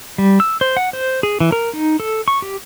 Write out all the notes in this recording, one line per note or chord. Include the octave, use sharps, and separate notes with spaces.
G3
E6
C5
F#5
C5
G#4
E3
A#4
D#4
A4
C#6
G4